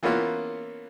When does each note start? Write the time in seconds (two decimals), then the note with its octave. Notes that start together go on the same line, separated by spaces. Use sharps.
0.03 E3 A#3 B3 C#4 F4